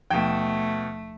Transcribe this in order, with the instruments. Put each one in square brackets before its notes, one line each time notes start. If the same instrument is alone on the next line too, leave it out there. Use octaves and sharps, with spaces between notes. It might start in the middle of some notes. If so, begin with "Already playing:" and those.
[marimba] D#2 F3 [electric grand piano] B2 G5 [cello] A3